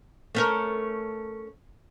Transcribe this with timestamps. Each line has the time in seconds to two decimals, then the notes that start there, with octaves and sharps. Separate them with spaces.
0.35 A3 C#4 A#4